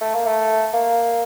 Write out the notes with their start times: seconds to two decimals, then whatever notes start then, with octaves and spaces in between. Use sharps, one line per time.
0.01 A3
0.14 A#3
0.26 A3
0.73 A#3